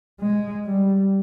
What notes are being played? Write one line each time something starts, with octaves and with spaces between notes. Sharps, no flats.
G#3
G3